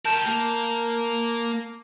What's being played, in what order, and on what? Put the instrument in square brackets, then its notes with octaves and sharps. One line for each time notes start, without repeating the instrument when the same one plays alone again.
[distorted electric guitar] G4 A#4 [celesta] A5 G6 E7
[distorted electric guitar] A#3